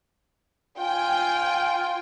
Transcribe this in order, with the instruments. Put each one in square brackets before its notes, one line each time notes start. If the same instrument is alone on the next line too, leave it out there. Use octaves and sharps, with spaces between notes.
[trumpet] F4 [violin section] G5 G#5